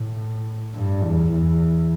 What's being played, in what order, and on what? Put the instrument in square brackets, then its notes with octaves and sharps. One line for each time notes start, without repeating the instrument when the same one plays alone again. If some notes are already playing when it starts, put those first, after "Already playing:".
Already playing: [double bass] A2
G2
E2
E2